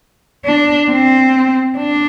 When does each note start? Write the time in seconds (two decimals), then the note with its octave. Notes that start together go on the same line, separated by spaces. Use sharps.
0.45 D4
0.90 C4
1.78 D4